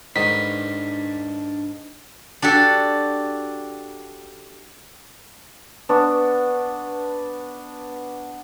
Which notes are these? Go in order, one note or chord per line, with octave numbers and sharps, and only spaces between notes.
G#2 D#3 D4 B4 B6
D4 F#4 G4 A4
B3 D4 C#6